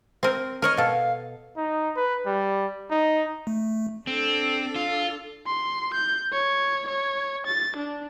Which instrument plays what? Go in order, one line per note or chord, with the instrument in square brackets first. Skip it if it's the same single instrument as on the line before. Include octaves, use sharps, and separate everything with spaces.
[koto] C4 A#4
[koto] A#4 C#5 D#5 [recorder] F6
[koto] B2 A4 [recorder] F5
[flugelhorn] D#4
B4
G3
D#4
[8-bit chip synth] A3
[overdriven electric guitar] C4 [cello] D4 A4
[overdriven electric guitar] F4
[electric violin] C6
G6
C#5
C#5
A6
D4